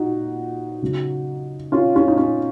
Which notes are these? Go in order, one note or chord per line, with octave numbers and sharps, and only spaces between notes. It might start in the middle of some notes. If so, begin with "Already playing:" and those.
Already playing: A#2 D#4 F#4
C#3 F#3
C#4 F4
C#4 F4
D#4
C#4